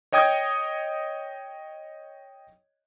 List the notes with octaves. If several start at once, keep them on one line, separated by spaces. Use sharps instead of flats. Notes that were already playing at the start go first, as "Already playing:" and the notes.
C#5 D#5 G5 D#6 G#6